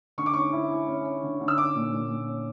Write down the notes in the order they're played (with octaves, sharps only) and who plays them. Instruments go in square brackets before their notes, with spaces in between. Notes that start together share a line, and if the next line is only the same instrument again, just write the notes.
[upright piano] D3 C#6
D6
C#4 C#6
E4
E4
C#4
C#4
D3
D3
E6
C#4 D6
A#2
A#2
A#2
C#4